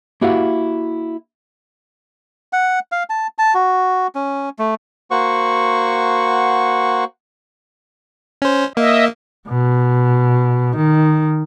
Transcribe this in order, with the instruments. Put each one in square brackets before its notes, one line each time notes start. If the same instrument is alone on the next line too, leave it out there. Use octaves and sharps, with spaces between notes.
[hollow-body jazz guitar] A#3 E4 F#4 G4 F5
[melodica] F#5
F5
A5
A5
F#4
C#4
A3
[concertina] A#3 F#4 C5 F#5 C#6
[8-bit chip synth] C#4 C5
[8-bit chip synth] A#3 [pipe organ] D#5 E5
[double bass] B2
D#3